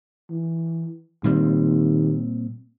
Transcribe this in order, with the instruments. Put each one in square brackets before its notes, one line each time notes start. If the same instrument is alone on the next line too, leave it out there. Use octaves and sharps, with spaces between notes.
[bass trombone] E3
[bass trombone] D#2 [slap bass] A#2 G3 C4